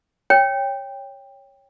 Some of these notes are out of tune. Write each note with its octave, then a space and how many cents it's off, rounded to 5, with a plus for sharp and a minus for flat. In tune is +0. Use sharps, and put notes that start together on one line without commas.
C#5 +0 G5 +15